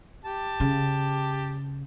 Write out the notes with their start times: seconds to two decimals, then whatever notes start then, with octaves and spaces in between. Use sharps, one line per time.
0.25 G4 A5
0.60 C#3